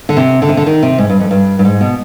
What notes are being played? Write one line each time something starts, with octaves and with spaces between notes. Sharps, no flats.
D3
C3
D3
C3
D3
D#3
C3
G#2
G2
F2
G2
G2
G#2
B2